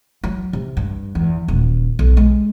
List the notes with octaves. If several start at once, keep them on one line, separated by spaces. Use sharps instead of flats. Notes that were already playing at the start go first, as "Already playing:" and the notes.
F#3
C3
G2
E2
D#1
B1
G#3